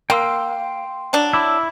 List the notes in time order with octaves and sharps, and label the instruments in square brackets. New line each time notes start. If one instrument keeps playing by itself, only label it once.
[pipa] A#3 [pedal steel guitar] G5 C6 E6
[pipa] F#3 D4
[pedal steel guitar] E4 [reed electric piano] B5 D6 E6